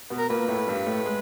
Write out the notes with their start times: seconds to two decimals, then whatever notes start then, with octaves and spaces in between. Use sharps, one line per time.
0.10 B2 B3
0.18 A#4
0.29 A#2 A#3 B4
0.48 A2 A3
0.67 G2 G3
0.86 A2 A3
1.06 G#3